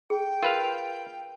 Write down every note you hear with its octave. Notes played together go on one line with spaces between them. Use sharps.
G#4 G5
F4 A#4 B4 F5